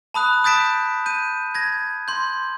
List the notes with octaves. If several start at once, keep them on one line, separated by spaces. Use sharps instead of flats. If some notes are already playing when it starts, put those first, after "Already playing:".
A5 B5 D#6 F#6
D#6 G6 A6 B6 D7 E7
G6 D#7
G#6 A#6
C6 G6